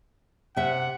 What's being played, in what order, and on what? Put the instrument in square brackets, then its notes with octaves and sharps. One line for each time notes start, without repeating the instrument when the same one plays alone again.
[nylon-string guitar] C3 E5 [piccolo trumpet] F#5